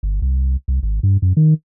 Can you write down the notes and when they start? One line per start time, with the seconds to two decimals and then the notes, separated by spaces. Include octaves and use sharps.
0.03 G1
0.22 C2
0.68 C2
0.83 G#1
1.03 G2
1.22 F#2
1.37 D#3